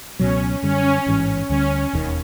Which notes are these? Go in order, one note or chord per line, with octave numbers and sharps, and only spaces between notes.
C#2 B2 F#3 C#4
F#2 D3 G3 C#4
A1 G#2 E3
D2 D3 G3 C#4
E1 D#2 D#3